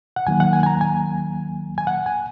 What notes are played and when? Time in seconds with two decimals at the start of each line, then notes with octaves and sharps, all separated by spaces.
0.16 F#5
0.27 D#2 D#3 F#3 A#3 G#5
0.40 F#5
0.53 G#5
0.63 G#5
0.66 A#5
0.81 G#5
1.78 G#5
1.87 F#5
2.06 G#5